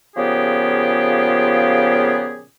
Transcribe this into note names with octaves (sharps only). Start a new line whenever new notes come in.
A#2 C#3 F3 B3 G4 G#4